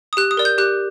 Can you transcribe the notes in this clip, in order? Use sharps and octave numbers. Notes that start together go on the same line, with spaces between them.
D#6
G4 F#6
D#6
A#4 D5
G6
G4 F#6